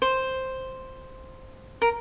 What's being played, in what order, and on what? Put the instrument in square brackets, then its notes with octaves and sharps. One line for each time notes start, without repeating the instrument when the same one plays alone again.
[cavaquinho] C5
A#4